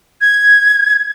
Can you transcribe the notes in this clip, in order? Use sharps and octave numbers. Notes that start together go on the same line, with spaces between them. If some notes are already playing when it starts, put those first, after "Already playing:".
G#6